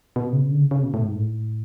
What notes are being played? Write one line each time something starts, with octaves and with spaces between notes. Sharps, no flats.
B2
C#3
D3
C#3
C#3
B2
A2
G#2
A2